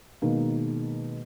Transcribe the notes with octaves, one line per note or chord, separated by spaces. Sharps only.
B2 D#3 G#3 A#3